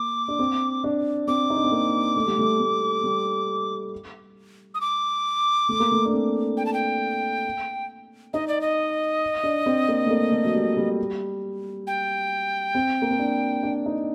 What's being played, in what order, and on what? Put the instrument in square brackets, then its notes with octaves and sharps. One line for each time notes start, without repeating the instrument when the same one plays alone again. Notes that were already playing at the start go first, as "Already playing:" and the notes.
Already playing: [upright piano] A#3 [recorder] D6
[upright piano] D4
C4
D4
[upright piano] C4 [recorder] D6
[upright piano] D#4
D4
C4
A#3
A3
G3
A3
A3
G3
[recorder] D#6
D6
[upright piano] A3
A#3
A3
D4
C4
[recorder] G5
A5
G5
[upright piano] D#4 [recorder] D#5
[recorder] D5
D#5
[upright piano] D4
C4
A#3
A3
A#3
A3
F#3
G3
G3
[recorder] G5
[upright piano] C4
A#3
C4
D4
D4
D#4